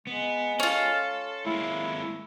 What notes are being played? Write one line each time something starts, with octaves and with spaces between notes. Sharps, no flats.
G#3 B3
C#4 F4 A4
G#3 A#3 E4